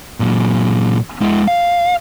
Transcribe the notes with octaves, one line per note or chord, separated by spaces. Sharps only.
A#2 F#3
G#3 E4
F5